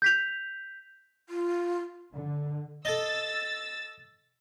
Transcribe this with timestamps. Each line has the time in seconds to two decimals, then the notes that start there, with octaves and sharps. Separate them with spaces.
0.02 G6 B6 F7
1.29 F4
2.13 D3
2.85 A4 D#5 E6 A6